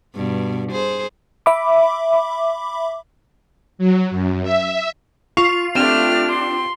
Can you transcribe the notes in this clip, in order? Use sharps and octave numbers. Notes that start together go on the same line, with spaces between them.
G2 B2
G#4 C5
E5 B5 D6
F#3
F#2
E5
F4 C#6
A3 C4 D4 G4 F6 E7
C6